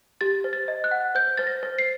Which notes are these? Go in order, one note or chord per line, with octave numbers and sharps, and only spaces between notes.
G4 A6
C5
A6
D#5
F#6
F#5
C5 G6
C5 A6
A#6
C5
C7